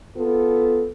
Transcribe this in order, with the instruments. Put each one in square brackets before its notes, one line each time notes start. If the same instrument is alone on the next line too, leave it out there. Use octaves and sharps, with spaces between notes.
[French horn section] B3 F4 A4